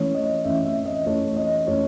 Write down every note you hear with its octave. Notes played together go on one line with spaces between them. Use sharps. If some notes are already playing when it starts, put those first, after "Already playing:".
Already playing: E3 A3 C#4 C#5
D#5
E3 A3 C#4 E5
E5
D#5
E3 A3 C#4 C#5
D#5
E3 A3 C#4 C#5